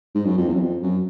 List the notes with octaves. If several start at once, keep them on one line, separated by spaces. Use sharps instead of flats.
G#2
F#2
F2
E2
F#2
F2
F#2